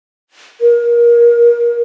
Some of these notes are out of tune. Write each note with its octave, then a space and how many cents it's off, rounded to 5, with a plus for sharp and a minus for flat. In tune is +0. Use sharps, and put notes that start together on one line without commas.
A#4 +25